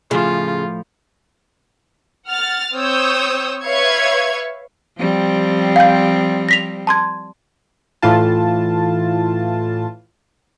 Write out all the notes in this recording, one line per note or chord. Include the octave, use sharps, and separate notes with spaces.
A2 C#3 F3 F4
F#5 F6 A6
C4 C#5 D#6 E6 G6
B4 C#5 E5 F5 C#6 G#6
F3 G3 C4
F5 G5 G6
A#6 B6 F7
A5 C6 G#6
A2 E3 F4 A5